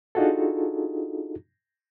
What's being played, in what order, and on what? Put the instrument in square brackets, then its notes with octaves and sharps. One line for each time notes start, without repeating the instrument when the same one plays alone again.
[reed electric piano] D4 D#4 F4 F#4 G#4 A4